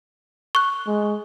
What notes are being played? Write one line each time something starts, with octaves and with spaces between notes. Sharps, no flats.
C#6 F#6
G#3